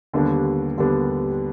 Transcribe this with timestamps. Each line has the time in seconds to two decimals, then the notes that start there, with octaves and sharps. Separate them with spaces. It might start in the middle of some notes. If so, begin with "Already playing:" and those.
0.13 D#2 D3 G3 B3 D4
0.77 D#2 D3 G3 B3 D4